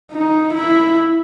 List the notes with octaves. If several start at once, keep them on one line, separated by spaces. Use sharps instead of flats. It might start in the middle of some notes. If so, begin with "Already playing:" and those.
D#4
E4